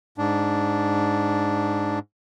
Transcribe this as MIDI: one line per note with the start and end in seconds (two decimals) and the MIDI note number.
0.18 1.99 44
0.18 1.99 62